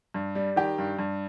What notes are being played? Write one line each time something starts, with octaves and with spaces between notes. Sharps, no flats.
G2
G3
D#3 G4
G2
G2